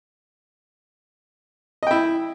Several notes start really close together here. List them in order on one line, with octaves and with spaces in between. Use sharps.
D#5 G5 E4